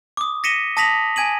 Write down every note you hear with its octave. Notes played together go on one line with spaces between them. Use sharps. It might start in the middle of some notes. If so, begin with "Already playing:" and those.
D6 D#6
A#6 B6 C#7 D#7 E7 G7
A5 D#6 A#6 B6 F7 F#7
G#5 G#6 D#7 F#7